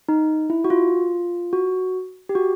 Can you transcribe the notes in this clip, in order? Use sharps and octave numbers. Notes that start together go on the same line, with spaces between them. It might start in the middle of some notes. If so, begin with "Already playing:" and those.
D#4
E4
F#4
F4
F#4
G4
F#4